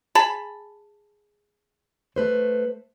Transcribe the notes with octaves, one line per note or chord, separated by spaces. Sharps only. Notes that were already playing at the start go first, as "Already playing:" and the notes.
G#4 A5 B5
A3 B4 C5